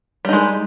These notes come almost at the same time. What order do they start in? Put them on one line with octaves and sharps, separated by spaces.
G3 D#4 G#3